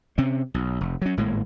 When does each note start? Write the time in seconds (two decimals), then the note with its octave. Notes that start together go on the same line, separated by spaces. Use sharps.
0.18 C3 C4 C#4
0.54 B1
0.81 F1
1.02 F#3 C#4
1.17 G#1 A2 G#3 A#3